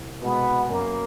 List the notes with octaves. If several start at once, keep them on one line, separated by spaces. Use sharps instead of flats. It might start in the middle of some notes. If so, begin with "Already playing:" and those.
Already playing: C2
B2 G#3 B3
F#2 A#3